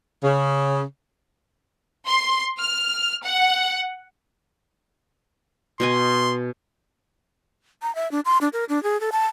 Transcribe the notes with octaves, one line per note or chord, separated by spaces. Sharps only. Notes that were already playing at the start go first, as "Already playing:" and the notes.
C#3
C6
F6
F#5
B2 D#5 G#5 C6
A#5
E5
D4
C6
D4
A#4
D4
G#4
A4
A5